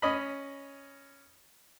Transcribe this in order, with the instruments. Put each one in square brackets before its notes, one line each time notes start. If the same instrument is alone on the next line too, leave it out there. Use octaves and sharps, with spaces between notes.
[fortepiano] C#4 D#5 B5